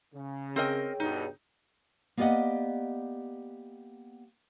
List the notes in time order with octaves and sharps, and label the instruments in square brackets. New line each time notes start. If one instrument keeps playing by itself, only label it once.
[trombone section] C#3
[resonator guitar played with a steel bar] C4 A#4 D#5 [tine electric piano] G#4 C#5 G5
[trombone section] G2 B2 [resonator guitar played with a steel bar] D#4
[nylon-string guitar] A#3 B3 G4 D5 D#5 F#5